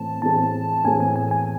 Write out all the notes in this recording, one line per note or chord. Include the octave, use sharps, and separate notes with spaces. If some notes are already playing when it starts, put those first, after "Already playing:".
Already playing: A2 E3 A3 C4 A5
A2 E3 A3 C4 G#4 A5
A2 E3 A3 C4 G#4 G#5
G#5
G#5
G#5